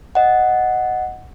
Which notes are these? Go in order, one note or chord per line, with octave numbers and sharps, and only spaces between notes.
D#5 F#5